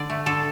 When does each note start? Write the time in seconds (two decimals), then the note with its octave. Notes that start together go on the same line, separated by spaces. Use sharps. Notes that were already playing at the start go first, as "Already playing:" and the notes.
Already playing: D3 D5
0.10 A3
0.26 D3 A4